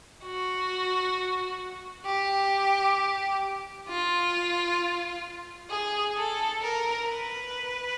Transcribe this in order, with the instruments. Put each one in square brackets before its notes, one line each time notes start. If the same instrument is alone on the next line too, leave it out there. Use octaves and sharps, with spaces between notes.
[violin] F#4
G4
F4
G#4
A4
A#4
B4